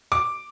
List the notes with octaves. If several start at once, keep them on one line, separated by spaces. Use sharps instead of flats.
D6